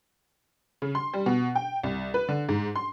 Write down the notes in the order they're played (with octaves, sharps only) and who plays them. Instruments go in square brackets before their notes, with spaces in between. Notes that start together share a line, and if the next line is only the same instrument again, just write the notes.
[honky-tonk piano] C#3
C6
G3
B2
G5
C2
B4
D3
G#2
C6